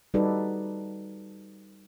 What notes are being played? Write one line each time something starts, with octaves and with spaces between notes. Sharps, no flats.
G3 D#4 F#4 A4 B4 D5